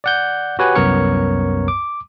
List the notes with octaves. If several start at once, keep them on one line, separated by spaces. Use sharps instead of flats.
D5 F#5 G6
F#4 G4 B4 C#5 F#5 G#5
C2 F#2 B3 A#4 C#5 C#7
D6